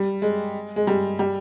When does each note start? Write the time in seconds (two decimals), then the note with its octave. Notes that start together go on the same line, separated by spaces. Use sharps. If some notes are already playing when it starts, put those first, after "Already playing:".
Already playing: G3
0.22 G#3
0.76 G#3
0.87 G3
1.19 G3